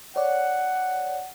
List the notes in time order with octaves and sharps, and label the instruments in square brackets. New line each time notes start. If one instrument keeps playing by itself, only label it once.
[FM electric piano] C#5 D5 [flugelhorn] F#5